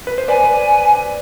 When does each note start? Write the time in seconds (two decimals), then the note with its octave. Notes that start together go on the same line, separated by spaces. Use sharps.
0.07 B4
0.18 C5
0.28 B4 D5 G#5
0.44 B4 D5